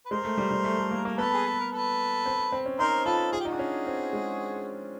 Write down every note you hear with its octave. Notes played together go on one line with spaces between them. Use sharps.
B4
G#3 A#4 C5
A3
G3
G3
A3
A3
A#3
A#3 A#4
B3 A4 B4
G#4
A4
A#4
A4 B4
C4
C4
C#4
D#4 A#4 C5
F4 A4 B4
F4 G#4
G4
D#4
D4 F#4 G#4
C#4
C4
G#3